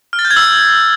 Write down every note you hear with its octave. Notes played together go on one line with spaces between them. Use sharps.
F6
A6
G6
G#6
E6